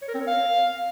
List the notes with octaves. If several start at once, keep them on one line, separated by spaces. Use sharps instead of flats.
C#5
A#4
C4
C#5
F5